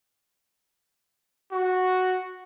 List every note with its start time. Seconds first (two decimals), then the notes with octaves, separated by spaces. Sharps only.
1.52 F#4